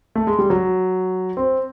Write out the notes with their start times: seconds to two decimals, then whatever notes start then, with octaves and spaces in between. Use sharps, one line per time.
0.15 A3
0.27 G#3
0.39 G3
0.50 F#3
1.37 C4